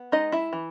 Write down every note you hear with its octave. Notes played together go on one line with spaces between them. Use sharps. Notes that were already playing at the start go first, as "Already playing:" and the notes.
Already playing: B3
G#3 D#4 D#5
E4 E5
E3